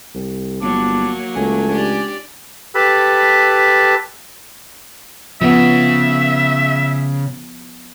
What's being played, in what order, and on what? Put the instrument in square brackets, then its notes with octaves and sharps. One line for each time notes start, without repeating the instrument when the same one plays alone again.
[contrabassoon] C2
[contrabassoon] G1 [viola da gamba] F#3 A#3 [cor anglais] D4
[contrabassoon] C#2 [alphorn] A3 [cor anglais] G#5
[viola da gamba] D4 G4 D5
[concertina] G4 A4 B4 A5 B5
[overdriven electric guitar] C#3 [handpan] F3 B3 [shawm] E5